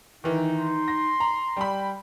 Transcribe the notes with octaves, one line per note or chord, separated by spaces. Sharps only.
D#3 E3 D#4
C6
A#6
A#5
G3 G5 B5